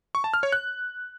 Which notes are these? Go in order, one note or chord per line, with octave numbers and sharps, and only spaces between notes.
C#6
A5
F6
C#5
F#6